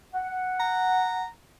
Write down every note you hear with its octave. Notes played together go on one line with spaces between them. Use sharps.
F#5
A#5